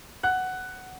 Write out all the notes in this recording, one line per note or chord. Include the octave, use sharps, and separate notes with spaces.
F#5 F#6